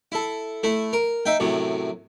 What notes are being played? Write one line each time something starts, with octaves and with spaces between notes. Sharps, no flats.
E4 A4
A3 E4
A#4
D#4 E5 G5
F#2 A2 C3